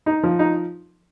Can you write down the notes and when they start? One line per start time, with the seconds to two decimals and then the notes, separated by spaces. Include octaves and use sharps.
0.06 D#4
0.23 F3
0.39 D#4